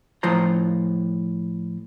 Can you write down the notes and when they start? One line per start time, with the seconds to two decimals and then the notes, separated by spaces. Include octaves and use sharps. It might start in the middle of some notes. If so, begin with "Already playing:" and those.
0.23 A2 F3 F4 C5 A#5